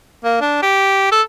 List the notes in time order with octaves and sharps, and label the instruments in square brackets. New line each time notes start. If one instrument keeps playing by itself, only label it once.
[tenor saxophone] A#3
D4
G4
A4